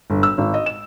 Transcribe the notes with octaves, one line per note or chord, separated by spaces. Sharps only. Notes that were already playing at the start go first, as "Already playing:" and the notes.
G1
E6
G#1
D#5
E7